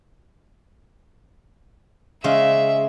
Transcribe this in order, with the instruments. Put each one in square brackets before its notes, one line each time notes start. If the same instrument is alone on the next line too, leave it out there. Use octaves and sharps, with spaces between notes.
[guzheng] C#3 G#3 [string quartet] E5